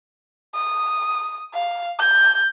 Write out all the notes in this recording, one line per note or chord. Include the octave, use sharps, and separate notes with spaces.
D#6
F5
G6